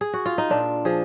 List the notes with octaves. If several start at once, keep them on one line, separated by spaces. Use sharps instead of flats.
G#4
F#4
F4
D#4
A#2 D4
F3 G#4